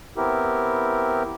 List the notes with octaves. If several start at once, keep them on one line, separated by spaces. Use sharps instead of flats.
B3 C4 E4 G4 A#4